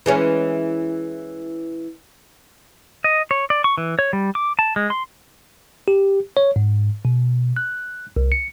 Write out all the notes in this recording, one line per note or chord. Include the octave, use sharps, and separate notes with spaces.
E3 G#3 C#4
D#5
C#5
D5
C#6
E3
C#5
G3
D6
A5
G#3
C6
G4
C#5
G#2
B2
F#6
C2
C#7